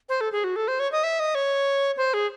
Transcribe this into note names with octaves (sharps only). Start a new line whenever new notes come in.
C5
A4
G#4
F#4
A4
C5
C#5
D#5
E5
D#5
C#5
C5
G#4